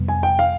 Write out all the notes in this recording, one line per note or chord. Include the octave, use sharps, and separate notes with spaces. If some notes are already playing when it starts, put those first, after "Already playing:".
Already playing: F2 C3 G3 B3
G#5
G5
F5